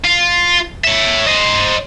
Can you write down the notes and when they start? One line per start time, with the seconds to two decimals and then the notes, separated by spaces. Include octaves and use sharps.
0.04 F4
0.84 C#5 E5
1.27 C5 D#5